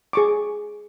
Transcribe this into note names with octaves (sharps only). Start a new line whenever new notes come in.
G#4 C#6 D6